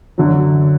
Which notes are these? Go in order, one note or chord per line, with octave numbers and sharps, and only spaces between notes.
F#2 D3 F#3